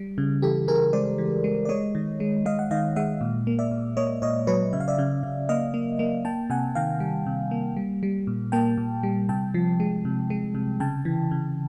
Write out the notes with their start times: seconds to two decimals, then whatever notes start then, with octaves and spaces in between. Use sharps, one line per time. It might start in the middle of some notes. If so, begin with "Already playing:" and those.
Already playing: G3
0.18 C#3
0.42 E3 G4 A4
0.68 C#3 G#4 A#4
0.93 G#3 C5 D5
1.18 E3
1.44 G#3
1.65 D5
1.69 G#3 C#5 D#5
1.95 D#3
2.20 G#3
2.45 G#3 D#5 F5
2.59 F#5
2.71 D#3 D#5 F5
2.96 G#3 E5 F#5
3.21 A#2
3.47 A#3
3.59 D5 E5
3.71 A#2
3.97 A#3 C#5 D#5
4.22 A#2 C#5 D#5
4.47 F#3 B4 C#5
4.73 C#3 E5
4.80 F5
4.88 D5 E5
4.98 C#3
5.23 C#3
5.49 A#3 D#5 F5
5.74 A#3
5.99 A#3
6.25 A#3 G5 A5
6.50 C3 F#5 G#5
6.75 D#3 F5 G5
7.00 G3
7.26 C3
7.51 A#3
7.77 G3
8.03 G3
8.27 A#2
8.52 A#3 G5 A5
8.77 A#2
9.03 G3
9.29 C3 G5 A5
9.54 F3
9.80 G#3
10.05 C3
10.30 G#3
10.55 C3
10.80 C#3 G5 A5
11.05 E3
11.31 C#3